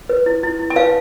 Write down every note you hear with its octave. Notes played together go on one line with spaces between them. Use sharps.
B4
E4
E4
E4
G#5
B4 F5 A5